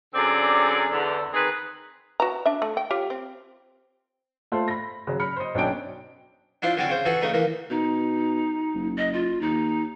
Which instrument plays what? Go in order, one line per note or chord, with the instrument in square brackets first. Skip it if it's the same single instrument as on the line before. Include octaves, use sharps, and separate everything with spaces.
[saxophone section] F#2 D3 C4 G#4 D5
E2 D3
D#3 C4 G#4 B4
[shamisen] F#4 B4 A#5
D4 E5
A3
G5
F4 G4 C#5
C4
[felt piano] A3 F4 C5
B5 A#6
C#3 F#3
B5 F6 C#7
C5 D#5
B1 F#3 C#4 D4 G5 D7
[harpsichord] D4 E4 F4 C5
D3 F#3 C4 C#4 D5
C#3 C5
E3 F#4 G#4 A4
C#3 A3 D#4
E3 A#3
[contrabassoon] B2 [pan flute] D#4
[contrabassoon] F#1
[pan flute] D#5
F4
[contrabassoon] D#2 [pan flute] D#4